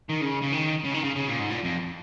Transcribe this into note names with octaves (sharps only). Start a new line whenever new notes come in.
D#3
C#3
C#3
D#3
C#3
D#3
C#3
C#3
A#2
G#2
A#2
F2